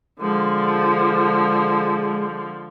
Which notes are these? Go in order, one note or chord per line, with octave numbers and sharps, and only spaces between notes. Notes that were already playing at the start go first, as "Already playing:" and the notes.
D3 F3 G#3